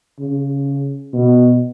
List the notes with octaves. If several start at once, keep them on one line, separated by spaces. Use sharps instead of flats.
C#3
B2